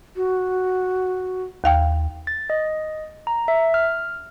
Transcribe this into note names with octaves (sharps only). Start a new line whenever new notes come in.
F#4
D#2 F5 G5
A6
D#5
A#5
E5
F6